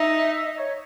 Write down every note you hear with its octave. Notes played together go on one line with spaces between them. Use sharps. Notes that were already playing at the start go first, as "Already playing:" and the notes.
Already playing: D#4 E5
E5
D#5
C#5